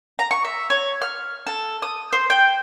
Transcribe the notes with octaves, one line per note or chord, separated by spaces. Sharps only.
A#5
C#6
E5
C#5
F6
A4
D#6
C5
G5